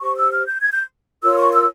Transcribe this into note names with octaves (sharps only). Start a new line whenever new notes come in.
G4 C5 C#6
E6
F6
G6
G#6
G6
F4 A#4 C#5 E6
C#6
E6